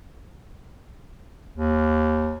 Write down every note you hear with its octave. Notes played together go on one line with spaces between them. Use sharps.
D#2